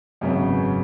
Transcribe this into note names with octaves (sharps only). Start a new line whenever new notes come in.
G#1 F#2 C#3 F#3 B3